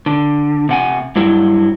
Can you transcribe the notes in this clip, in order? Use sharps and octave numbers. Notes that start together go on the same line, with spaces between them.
D3
C3 F#5 G#5
G2 F#3 E4